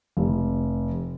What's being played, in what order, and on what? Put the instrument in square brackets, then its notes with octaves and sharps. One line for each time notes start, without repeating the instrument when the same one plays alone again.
[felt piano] F1